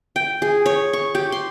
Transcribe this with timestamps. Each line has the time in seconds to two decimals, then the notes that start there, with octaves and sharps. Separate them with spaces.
0.16 G5
0.42 G#4
0.66 C#5
0.93 C#6
1.15 G4
1.32 C6